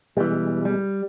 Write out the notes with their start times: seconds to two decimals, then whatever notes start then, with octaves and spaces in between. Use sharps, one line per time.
0.17 B2 E3 G3 G#3
0.65 G3